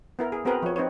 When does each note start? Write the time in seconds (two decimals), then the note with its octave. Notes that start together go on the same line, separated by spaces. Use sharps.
0.19 B3 E4 A#4
0.32 G#4
0.45 B3 C4 F#4 G#4 A#4 B4
0.62 F3 C#5
0.76 C4 D#4 B4 C#5